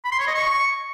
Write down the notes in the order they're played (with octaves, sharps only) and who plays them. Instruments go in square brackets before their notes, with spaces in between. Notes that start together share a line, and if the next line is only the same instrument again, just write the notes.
[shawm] B5
C6
C#5
D#5
C#6